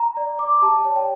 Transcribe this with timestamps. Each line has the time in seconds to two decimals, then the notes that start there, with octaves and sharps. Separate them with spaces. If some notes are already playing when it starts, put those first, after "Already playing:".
Already playing: A#5
0.17 D5
0.39 D5 D6
0.62 G4 A5
0.84 C#5 A5
0.96 G5